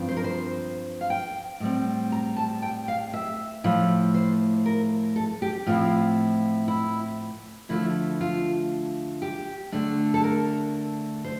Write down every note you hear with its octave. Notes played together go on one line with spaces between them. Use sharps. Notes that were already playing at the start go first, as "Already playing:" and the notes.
Already playing: G2 F3 C4
C5
A#4
C5
F5
G5
A2 G3 C4
A#5
A5
G5
F5
E5
A2 F3 A3 E4
C5
A#4
A4
G4
A2 F3 C4 E4 F4
E4
D3 F3 A3 E4
F4
G4
D3 A3 D4
A4
A#4
C5